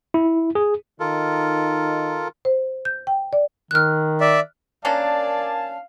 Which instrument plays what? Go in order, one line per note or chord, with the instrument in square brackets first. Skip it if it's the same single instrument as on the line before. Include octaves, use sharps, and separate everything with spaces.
[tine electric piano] E4
G#4
[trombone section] D#3 D#4 [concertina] F4 A4 A#4
[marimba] C5
G6
G5
D5
[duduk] D#3 [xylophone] F6 F#6
[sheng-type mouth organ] D5 E5
[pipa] A#3 C#4 D4 [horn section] A#4 G#5 A5 [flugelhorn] D5 [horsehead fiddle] F5